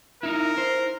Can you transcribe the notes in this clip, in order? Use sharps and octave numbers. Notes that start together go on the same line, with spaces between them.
D#4 E4 A#4
C5